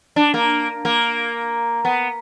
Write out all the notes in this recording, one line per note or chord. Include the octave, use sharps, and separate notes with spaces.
D4
A#3
A#3
B3